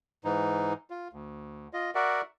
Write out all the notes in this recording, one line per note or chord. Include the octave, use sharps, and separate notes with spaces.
G#2 E3 D#4
F4
D2
F4 D#5
F#4 A#4 D5 E5 F#5